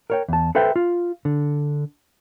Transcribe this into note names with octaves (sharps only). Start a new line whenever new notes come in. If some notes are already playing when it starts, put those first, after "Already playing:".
A#4 C#5 G5
E2 A5
A4 B4 C5 E5 G5
F4
D3